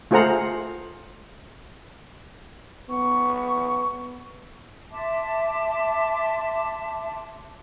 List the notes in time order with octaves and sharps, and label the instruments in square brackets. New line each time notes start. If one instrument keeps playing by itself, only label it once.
[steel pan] A3 F4 G#4 C5 F#5 A#5
[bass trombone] B3 [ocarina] C#6
[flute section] E5 A5 C6 D6